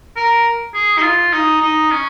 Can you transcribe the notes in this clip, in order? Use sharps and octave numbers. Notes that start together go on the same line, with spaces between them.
A#4
G#4
D#4
F4
D#4
D#4
C#4